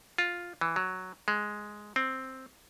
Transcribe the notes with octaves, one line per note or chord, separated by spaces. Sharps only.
F4
E3
F#3
G#3
C4